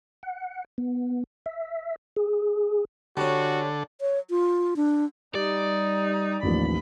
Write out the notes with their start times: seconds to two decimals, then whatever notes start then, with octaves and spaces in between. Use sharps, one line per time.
0.23 F#5
0.78 B3
1.46 E5
2.16 G#4
3.17 D3 G3 C#4 F#4 A4
4.01 C#5
4.30 F4
4.76 D4
5.35 G3 D#4 D5
6.43 A1 D#2 F3 B5